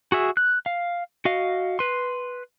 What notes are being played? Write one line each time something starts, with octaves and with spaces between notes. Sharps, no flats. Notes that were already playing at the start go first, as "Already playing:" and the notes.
F#4 G#4 E5
F#6
F5
F#4 D#5 F5
B4 C6